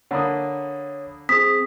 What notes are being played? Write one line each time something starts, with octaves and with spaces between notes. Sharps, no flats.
D3 A#3 C#5 B5 D#6
C4 G#4 D#6 B6